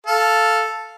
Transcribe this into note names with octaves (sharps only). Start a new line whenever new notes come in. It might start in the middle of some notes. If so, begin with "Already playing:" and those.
A4 F5